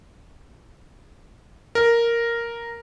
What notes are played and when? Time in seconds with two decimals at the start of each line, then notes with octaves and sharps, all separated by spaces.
1.75 A#4